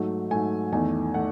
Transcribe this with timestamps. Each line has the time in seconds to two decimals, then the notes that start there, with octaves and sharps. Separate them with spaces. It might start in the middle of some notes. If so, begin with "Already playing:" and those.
Already playing: G#2 F#3 A3
0.31 G#2 F#3 A3 G#5
0.72 E2 D#3 A3 G#5
1.14 D#3 A3 F#5